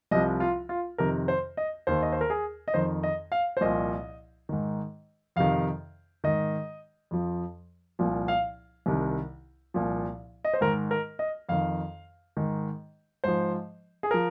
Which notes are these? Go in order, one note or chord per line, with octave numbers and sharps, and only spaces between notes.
C2 C3 F3 D#5
F4
F4
F2 C3 D#3 A#4
C5
D#5
D#2 D#3 C5
D#5
C5
A#4
G#4
D#5
F2 D#3 C5
D#5
F5
C5
C2 A#2 F3 D#5
G#2 D#3
F2 C3 D#3 F5
G#2 D#3 D#5
F2 F3
C2 A#2 F3
F5
C2 C3 D#3
C2 A#2 F3
D#5
C5
G#2 D#3 A#4
A#4
D#5
F2 D#3 F5
G#2 D#3
G#2 F3 C5
G#4
F3 A#4